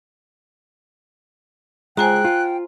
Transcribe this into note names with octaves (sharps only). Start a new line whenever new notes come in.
G#3 F4 C5 G5 G#5 A#5 F#6
F4